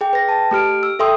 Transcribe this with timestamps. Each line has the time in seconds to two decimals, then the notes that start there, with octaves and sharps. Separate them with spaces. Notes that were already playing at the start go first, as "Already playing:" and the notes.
0.01 G#4 G5
0.13 B4 G5 A#6
0.29 A5
0.51 A3 G4 F6 D7
0.83 E6
0.99 A4 E5 G5 C6 D#6 E6